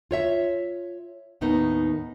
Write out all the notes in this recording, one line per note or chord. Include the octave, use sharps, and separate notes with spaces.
F4 C#5 E5
D#2 A2 B3 D#4